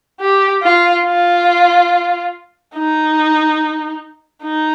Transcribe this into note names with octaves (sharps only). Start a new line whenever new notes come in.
G4
F4
F4
D#4
D#4